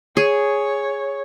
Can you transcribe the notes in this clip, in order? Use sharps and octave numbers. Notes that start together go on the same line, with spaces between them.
G#4 C#5